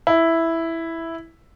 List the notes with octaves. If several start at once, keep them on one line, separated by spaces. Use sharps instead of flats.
E4